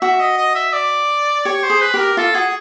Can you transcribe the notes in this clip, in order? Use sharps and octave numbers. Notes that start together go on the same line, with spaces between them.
F#4 E5
D#5
D#5
E5
D5
G4 C#5
C5
G#4
B4
G4
A#4
F4 A4
F#4 G#4